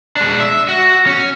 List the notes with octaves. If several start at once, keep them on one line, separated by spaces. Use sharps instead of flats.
G#3 D4
E5
F#4
C#4